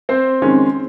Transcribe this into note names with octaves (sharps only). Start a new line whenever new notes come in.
C4 C5
F2 D#3 G#3 C#4